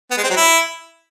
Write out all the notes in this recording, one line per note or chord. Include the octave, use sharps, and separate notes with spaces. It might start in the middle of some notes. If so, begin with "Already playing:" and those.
B3
G#3
C4
F#3
E4